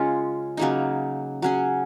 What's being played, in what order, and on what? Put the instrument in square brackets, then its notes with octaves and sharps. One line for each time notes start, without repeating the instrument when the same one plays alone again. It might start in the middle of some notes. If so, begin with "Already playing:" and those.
Already playing: [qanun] C#3 G#3 C#4 F4
C#3 F#3 A#3 D#4
F#3 C#4 G#4